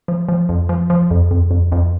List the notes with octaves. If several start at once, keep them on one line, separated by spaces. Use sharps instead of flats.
F3
F3
F2
F3
F3
F2
F2
F2
F2